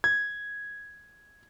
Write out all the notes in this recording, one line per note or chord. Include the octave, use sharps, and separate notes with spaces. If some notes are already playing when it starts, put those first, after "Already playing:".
G#6